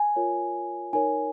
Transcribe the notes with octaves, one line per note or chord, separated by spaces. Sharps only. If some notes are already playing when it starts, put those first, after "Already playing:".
Already playing: G#5
F4 A#4 C#5
D#4 A#4 C#5 G#5